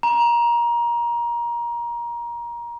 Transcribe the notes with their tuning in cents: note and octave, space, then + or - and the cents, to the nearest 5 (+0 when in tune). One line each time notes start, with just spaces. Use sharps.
A#5 +20